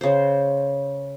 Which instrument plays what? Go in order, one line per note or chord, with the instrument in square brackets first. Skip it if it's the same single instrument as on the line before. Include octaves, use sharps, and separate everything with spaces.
[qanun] C#3 C5